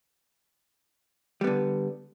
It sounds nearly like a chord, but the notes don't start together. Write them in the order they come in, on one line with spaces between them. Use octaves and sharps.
G3 B3 D3